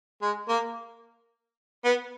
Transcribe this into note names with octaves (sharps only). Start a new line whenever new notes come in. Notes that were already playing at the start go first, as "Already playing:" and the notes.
G#3
A#3
B3